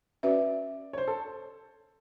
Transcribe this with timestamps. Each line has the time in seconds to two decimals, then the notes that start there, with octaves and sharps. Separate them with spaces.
0.23 C#4 F#4 B4 D5 E5
0.93 C#5
0.98 C5
1.08 A4